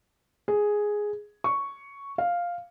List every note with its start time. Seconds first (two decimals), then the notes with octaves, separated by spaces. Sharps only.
0.48 G#4
1.44 C#6
2.18 F5